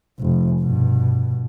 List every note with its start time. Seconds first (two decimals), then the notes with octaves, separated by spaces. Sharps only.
0.20 F1
0.61 G2 B2